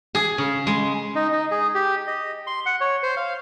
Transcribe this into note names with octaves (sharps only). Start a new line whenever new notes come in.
G#4
C#3
G#3
D#4
D#4
G#4
G4
D#5
C6
F#5
C#5
C5
F5